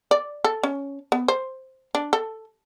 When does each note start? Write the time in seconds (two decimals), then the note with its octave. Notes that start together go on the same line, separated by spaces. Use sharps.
0.11 D5
0.44 A4
0.63 C#4
1.12 B3
1.28 C5
1.95 D4
2.13 A4